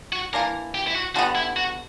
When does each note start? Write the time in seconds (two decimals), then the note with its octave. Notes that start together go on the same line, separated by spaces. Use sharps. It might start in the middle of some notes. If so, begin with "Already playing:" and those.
0.13 F#4
0.33 E3 A#3 D4 A#4
0.75 G4
0.87 E4
0.95 F#4
1.15 D3 G3 B3 F#4
1.35 E4
1.56 F#4